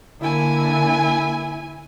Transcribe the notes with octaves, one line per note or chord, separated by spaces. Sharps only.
D3 A#3 E4 G#5